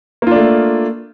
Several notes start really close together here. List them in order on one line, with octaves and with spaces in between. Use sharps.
A#3 F4 D4 A3